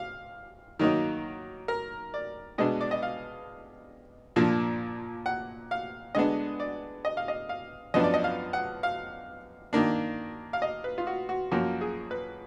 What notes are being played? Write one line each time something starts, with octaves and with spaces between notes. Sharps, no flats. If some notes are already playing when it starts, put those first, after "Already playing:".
Already playing: F5
D#3 F#3 A#3 D#4
A#4
D5
B2 G#3 B3 D4 D#5
D5
D#5
F5
A#2 F3 A#3 D4
F#5
F5
D3 G#3 B3 D4 D#5
D5
D#5
F5
D#5
F5
F#2 F3 B3 D4 D#5
D5
D#5
F5
F#5
F5
D#3 A#3 D4
F5
D#5
B4
F4
F#4
F#4
F#2 F3 A#3 F#4
G#4
B4